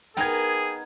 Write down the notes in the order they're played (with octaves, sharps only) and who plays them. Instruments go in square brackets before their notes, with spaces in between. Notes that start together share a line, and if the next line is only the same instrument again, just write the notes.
[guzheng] B3 D#4 A#4 [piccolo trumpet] G#4 [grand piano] G5 G#6